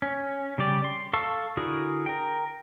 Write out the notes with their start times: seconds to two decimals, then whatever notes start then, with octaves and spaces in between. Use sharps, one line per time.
0.02 C#4
0.58 C#3 G3 G4 D5
0.84 C6
1.13 A4 F5 A5 C#6 E6
1.57 D3 E4 F#4 G#4 A#4
2.06 A#4 G5